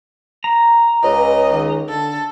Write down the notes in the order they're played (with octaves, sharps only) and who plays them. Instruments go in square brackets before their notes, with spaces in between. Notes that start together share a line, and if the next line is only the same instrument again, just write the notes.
[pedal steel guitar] A#5
[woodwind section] C#2 [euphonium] B4 [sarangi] D#5
[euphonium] D#3
[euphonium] D3 [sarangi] A4